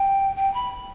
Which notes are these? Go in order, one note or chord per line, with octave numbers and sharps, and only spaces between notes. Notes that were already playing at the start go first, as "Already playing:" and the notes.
Already playing: G5
G5
B5